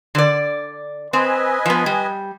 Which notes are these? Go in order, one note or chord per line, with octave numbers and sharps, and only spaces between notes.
D3 D5
C4 B4 D#5 G#5
F3 B3
G3